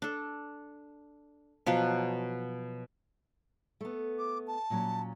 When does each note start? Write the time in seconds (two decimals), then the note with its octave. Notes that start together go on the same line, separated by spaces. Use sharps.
0.02 D4 A4
1.66 B2 F3 F#3 B3
3.81 A3 B3
4.19 D6
4.47 A5
4.70 A#2 F#3 C#4